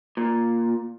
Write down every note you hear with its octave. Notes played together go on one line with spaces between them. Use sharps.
A#2